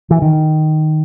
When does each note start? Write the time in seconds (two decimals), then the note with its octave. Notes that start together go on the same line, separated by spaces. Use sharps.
0.11 E3
0.22 D#3